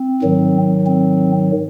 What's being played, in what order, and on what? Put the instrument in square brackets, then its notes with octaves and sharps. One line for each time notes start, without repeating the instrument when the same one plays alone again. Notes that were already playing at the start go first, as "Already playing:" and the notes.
Already playing: [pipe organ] C4
G#2 D#3 F#3
C4